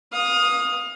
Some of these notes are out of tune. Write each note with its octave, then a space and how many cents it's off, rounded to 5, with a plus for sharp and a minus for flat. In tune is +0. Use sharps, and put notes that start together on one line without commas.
F5 +25 D#6 +0